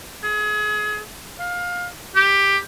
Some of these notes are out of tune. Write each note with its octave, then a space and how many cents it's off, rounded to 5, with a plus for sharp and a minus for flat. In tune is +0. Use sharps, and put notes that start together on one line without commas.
G#4 +30
F5 +25
G4 +10